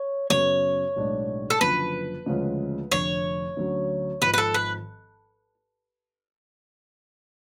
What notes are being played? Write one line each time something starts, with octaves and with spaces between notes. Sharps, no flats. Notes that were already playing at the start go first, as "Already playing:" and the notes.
Already playing: C#5
F#2 C#3 F#3 B3 C#5
B1 A2 G#3 D4
A4
F#1 F#2 D3 F3 B4
D2 C#3 F3 G#3 C#4
F1 F2 D3 C#5
D2 D3 F#3 C#4
G#1 G#2 F3 B4
B4
A4
B4